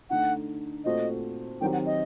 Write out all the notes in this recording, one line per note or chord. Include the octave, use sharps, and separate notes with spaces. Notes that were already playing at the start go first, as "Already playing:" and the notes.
D3 A3 D#4 F#5
A#2 A3 C4 F#4 C5 D#5
D#3 F#3 C4 G4 G5
F#5
D#5